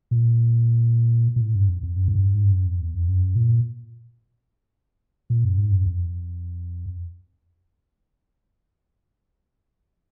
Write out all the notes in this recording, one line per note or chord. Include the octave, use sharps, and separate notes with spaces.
A#2
A#2
A2
G2
F2
F2
F#2
G#2
G2
G#2
G2
F#2
F2
E2
F2
F#2
A#2
A#2
F#2
G#2
F#2
F2